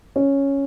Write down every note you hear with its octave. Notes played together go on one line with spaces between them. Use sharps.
C#4